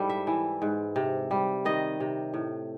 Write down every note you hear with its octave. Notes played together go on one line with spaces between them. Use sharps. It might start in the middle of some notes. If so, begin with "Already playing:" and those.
Already playing: G#2 G3 E4 A4
E5
E3
G#2
C3
G3
D#3 D#5
C3
A2